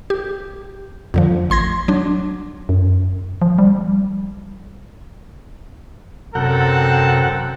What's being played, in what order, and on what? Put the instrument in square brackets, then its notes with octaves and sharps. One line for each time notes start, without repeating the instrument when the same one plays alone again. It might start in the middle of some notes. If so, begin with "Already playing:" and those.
[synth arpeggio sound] G4
F2 D3 F3
A1 C6 G#6 A#6
F#3 D4
[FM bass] F#2
F3
G3
[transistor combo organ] F#2 A#4 F#5 [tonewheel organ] C3 G6 A#6 [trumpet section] C4 A4